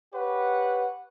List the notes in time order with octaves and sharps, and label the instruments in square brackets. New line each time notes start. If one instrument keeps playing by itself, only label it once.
[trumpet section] G4 B4 C#5 F#5